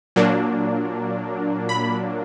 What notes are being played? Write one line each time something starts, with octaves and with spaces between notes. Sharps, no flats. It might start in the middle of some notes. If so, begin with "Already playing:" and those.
A#2 F#3 A#3 D4
B5